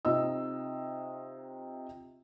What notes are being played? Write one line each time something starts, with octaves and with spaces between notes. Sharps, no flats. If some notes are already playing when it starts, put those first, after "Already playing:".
C3 D#4 F4 D#5 E6